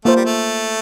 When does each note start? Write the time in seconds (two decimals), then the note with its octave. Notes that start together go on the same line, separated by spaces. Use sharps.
0.05 A3 A#3 F4 C5
0.16 G3
0.25 A3